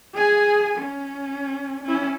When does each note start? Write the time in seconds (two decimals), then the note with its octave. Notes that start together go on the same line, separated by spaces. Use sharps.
0.15 G#4 G#5
0.78 C#4
1.84 C#4 E4